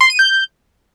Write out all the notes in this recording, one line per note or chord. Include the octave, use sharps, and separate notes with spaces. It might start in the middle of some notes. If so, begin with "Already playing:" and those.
C6
D#7
G6